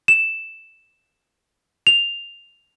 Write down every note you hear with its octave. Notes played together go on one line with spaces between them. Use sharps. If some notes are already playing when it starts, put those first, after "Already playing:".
E7
F7